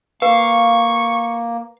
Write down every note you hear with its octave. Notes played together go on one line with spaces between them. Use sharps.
A#3 B4 F5 C#6